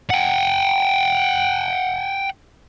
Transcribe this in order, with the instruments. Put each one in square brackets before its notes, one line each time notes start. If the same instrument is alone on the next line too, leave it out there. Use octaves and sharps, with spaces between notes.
[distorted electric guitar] F#5 G5